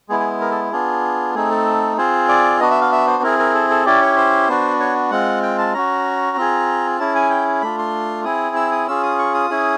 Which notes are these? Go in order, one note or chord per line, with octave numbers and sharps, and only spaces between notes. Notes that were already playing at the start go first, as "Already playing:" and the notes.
G#3 B3 E4 G#4
G#4
A#4
A4
B3 D4 F4 G#4
A3 C4 D#4 G#4
A4
C4 F4 G#4 C5
D5
B3 D4 F#4 D#5
E5
F5
E5
C5
C4 E4 G#4 A#4
A#4
A4
A4
C#4 E4 G4 D5
C#5
C5
B3 D4 F#4
C#5
G#3 C4 F4 F#5
G5
A5
C#4 F#4 A#5
C4 F4 G#4
C#4 E4 G#4 A5
G#5
G5
A3 D4 F4 B5
C6
C4 E4 G#4 D#6
E6
D#6
C#4 F4 G#4 E6
D#6
C#6
D#6
C#4 E4 G#4